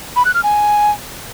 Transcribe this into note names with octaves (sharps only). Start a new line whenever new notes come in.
B5
F#6
F6
G#5